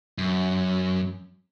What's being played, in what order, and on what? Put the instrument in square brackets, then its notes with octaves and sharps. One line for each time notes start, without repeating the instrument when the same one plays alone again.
[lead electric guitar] F#2